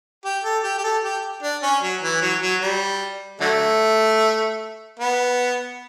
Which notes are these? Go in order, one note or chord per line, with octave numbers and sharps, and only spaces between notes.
G4
A4
G4
G4
A4
G4
D4
C#4
F#3
E3
F#3
F#3
G3
D3 F#3 A3
B3